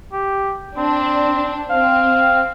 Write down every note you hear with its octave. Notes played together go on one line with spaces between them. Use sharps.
G4
C4 D4
C4 F5